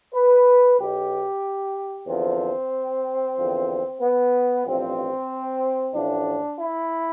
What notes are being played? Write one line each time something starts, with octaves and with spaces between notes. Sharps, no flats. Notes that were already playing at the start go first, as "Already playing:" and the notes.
B4
B1 B2 G4
E2 D3 F3 C4
E2 D3 F3
B3
A1 G2 F3 C4
A1 A2 F3 D4
E4